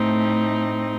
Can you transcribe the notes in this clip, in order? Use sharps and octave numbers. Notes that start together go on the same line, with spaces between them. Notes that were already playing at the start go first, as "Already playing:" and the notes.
Already playing: A2 A3 C4 D#4